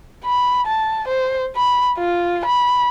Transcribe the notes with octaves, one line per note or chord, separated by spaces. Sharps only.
B5
A5
C5
B5
F4
B5